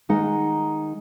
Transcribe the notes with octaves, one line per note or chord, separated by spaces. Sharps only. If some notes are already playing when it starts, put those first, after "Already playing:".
D#3 G#3 D#4 F#5